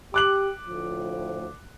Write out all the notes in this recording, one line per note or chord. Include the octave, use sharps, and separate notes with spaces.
G4 D6 F#6 F#7
D2 A2 F3